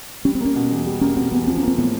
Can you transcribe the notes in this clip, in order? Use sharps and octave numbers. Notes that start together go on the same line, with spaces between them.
G3 C#4
C4
A#3 C#4
B2
E2
G3
A#3 C#4
B2 C4
E2 B3
F3 C4
C#4
A#3
C4
A2 B3